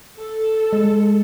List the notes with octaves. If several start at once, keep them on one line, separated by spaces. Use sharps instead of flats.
A4
G#3